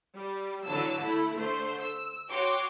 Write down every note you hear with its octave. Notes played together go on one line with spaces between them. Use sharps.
G3
D3 E3 F#3 A5 E6
A3 E4
D3 A3 C5
E6
F#4 C#5 G5 C6 D6